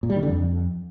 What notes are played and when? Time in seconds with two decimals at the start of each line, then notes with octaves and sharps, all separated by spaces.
0.03 A#2
0.10 G3
0.16 D#3
0.23 D3
0.29 F2